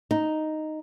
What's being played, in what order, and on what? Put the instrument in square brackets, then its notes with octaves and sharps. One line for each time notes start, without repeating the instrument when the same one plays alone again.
[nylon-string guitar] D#4